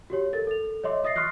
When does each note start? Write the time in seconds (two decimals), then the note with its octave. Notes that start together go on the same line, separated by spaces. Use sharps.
0.10 F#4 G4 C#5
0.33 A4 A#4 A6
0.47 A4 F7
0.84 C#5 D#5 E5 C6 D6
1.04 E5 D#6 A6 A#6 C7
1.16 C6 C#6 F6 F#6 C7